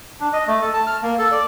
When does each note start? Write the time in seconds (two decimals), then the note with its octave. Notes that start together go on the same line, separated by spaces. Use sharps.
0.20 D4
0.33 D#5
0.47 A3
0.62 A4
0.74 A5
0.87 F6
1.03 A#3
1.19 A4
1.31 D5